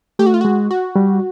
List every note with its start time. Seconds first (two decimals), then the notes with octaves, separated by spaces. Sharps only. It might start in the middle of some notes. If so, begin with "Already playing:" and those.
0.19 A3 G4
0.26 F#4
0.34 F4
0.41 G#3 F#4
0.71 F#4
0.96 G3